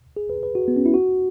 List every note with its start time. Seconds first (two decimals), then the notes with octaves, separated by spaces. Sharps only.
0.17 G#4
0.30 B4
0.43 B4
0.55 F#4
0.68 B3
0.77 C#4
0.86 E4
0.94 F#4